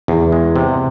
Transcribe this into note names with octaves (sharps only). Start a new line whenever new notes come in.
E2
G#3
C3